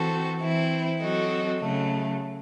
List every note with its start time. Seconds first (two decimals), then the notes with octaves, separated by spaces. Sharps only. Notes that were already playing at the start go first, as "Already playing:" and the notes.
Already playing: E3 C4 F#4 A4
0.40 E3 C4 E4
1.00 F#3 C4 F#4 A4 D#5
1.60 C#3 F#3 A3